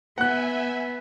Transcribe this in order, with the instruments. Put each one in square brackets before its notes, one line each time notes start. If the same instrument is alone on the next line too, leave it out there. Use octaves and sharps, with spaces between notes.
[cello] B3 [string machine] E5 G#5 [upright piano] F#5 F#6